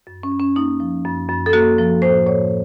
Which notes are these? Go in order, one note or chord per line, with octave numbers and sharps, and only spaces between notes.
F#2
C#4
F#2
C#4
A#3 D#4
F3
F#2
F#2
A4
A#3 F#4
F3
A2 C5
A2 C#5